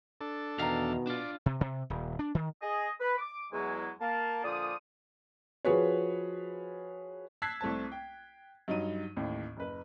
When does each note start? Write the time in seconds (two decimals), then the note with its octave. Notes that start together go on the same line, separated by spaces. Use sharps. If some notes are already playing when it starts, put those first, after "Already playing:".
0.21 D4 A4
0.59 E2 B2 D#3 F5 A#5
1.07 D4 F4 D5
1.46 C3
1.61 C3
1.90 D#1
2.19 D4
2.35 D#3
2.62 G#4 D#5
3.01 B4
3.18 D6
3.52 E2 F#3 G#3 G#5
4.00 A#3 A5
4.44 A#2 D3 F3 D5 D6 D#6
5.65 F3 F#4 G#4 B4 C#5
7.42 A5 E6 F#6 G#6 B6 C7
7.61 C2 A3 C4 A5
7.92 G5
8.68 G2 F#3 D#4 D#5 D#7
9.16 A1 D#2 A2
9.57 F#1 B4